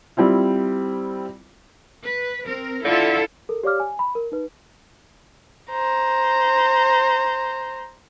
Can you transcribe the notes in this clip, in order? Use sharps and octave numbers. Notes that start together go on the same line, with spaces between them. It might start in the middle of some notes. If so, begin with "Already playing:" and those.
G3 C4 E4 F4
B4
C4 A#4
D3 E4 F4 A4
A4 A#4
G4 C#5 D5 F5 D6 F6
G#5
B5
A#4
D#4 B4
C5 A#5